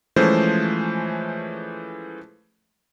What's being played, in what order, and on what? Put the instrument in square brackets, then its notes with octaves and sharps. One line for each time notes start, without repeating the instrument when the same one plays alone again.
[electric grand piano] E3 F3 G#3 A3 C#4 C5